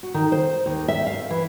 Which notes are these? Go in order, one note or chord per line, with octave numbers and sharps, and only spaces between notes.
F#4
D#3
C5
D#2
E5
F5
E3